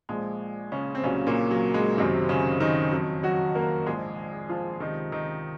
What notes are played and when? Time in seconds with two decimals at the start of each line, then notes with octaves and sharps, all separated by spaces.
0.09 A#1 A#2 F3 G#3
0.72 C#3 C#4
0.95 C4
1.03 C2 A#2 C#3 F#3 C#4
1.27 A#2 A#3
1.51 F#3
1.74 G#3
1.97 F#1 F#2 C3 D#3 F#3 C4
2.29 C#3 C#4
2.60 D#3 D#4
2.92 F2 D#3 F#3
3.23 F#3 F#4
3.55 A#3 A#4
3.86 A#1 G#2 F3 G#3 G#4
4.49 F3 F4
4.80 C#2 C3 D#3 F3 D#4
5.12 D#3 D#4